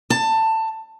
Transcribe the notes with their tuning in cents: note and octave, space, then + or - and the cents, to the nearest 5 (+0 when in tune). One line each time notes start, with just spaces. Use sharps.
A5 +20